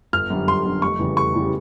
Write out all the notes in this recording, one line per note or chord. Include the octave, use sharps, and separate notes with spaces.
G1 F6
F#2 D3 G3
G1 C6
F#2 D3 G3
F1 C#6
E2 C#3 E3 G3
F1 C#6
E2 C#3 E3 G3